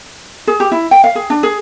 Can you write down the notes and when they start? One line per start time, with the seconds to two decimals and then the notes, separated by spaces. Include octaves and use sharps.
0.47 G#4
0.60 G4
0.72 E4
0.91 G5
1.04 F5
1.15 G#4
1.30 D4
1.43 G#4